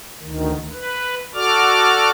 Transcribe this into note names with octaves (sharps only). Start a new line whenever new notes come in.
D2 D#3
B4
F#4 A4 D5 D6 F6